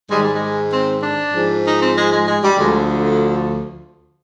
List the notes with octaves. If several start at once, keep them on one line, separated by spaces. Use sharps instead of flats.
G#2 D#3 G3 G#3
G3
G#3
C4
D4
G#2 F3
D#4
C4
G#3
G#3
G#3
G3
D2 D3 F3 G#3